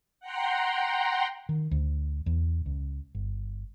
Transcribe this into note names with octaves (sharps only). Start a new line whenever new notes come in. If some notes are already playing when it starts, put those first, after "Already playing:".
F#5 G5 A#5 C6
D#3
D2
E2
C#2
G1